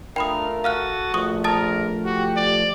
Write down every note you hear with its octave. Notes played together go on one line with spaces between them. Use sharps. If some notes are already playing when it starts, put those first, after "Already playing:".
A3 D4 F4 A#4 G5 B5 D#6 F6
F#4 A4 F5 D#6 F6 F#6 A6
A#1 F3 A3 C#6 D#6
A#4 A5 D#6 A6
F#4 G4
D5